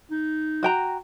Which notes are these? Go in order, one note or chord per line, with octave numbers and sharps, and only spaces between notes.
D#4
F#4 G5 A#5